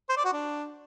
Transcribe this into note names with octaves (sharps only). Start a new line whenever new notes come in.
C5
D5
F#4
D4